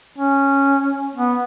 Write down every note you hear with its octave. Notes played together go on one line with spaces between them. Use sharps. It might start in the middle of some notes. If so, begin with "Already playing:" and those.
C#4
B3